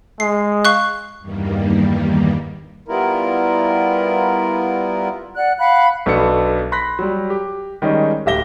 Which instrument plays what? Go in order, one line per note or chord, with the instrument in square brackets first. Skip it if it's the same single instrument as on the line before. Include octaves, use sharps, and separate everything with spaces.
[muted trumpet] G#3 [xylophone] C7
[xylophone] F5 C#6 F#6
[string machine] E2 G2 D#3 G3 A#3
[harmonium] G3 B3 E4 F4 A#4
[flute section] D5 F#5 F#6
F5 F#5 B5 F#6
[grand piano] B1 B2 B3 D4 A4 C#7
B5 C6 F#6 A#6 B6
F#3 G3
G4
D#3 G3 G#3 C#4 D#4
D1 G4 E5 A#6 G7